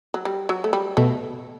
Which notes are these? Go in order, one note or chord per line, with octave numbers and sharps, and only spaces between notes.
F#3
G3
F#3
A3
G3
B2 A3